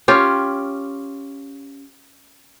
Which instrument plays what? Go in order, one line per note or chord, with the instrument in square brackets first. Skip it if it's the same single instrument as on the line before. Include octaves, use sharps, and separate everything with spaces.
[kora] C#4 F4 G4